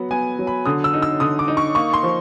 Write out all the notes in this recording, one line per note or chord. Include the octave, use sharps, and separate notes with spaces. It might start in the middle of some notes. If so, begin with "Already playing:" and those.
Already playing: F#3 B3
B3 G#5
F#3
B5
D3 D#6
E6
D#4
E6
D3 D#6
D6
D#4
C#6
A#3 C#6
C6
F3